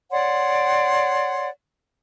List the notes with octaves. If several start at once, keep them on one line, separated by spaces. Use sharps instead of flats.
C#5 D5 F#5 C6